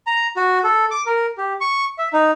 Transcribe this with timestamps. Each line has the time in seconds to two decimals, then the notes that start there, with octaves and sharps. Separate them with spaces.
0.07 A#5
0.37 F#4
0.64 A4
0.91 D6
1.06 A#4
1.38 G4
1.61 C#6
1.98 E5
2.13 D#4